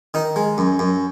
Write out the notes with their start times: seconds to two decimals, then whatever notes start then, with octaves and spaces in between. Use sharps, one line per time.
0.14 D#3 D#4
0.36 G#3
0.58 F#2
0.79 F#2